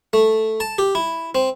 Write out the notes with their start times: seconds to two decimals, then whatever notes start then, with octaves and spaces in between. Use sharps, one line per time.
0.13 A3
0.60 A5
0.78 G4
0.95 E4
1.35 C4